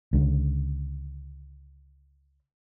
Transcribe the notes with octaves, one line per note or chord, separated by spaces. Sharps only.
C#2 D3